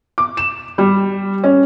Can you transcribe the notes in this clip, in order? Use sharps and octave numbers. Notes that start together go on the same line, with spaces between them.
D6
E7
G3
C#4